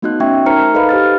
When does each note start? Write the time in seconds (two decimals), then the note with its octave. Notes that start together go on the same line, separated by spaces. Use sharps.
0.02 A3 B3 D#4 F#4 D#5 F#6
0.20 A3 C#4 E5 G5 C#6 G#6
0.46 D#4 A#4 C5 A#5 F6 C#7
0.74 D#4 A4 B4 D#5 F5 B5
0.89 G4 C5 F6 A6